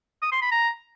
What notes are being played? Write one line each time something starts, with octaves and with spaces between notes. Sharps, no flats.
D#6
C6
B5
A#5